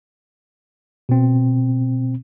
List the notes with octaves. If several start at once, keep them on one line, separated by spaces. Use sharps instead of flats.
B2 C4